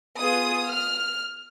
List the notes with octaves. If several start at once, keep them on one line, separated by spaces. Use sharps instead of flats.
B3 F4 G#4 D#6
F6